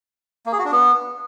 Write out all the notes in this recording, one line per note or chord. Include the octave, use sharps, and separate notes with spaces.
A#3
G#4
F#4
D4
B3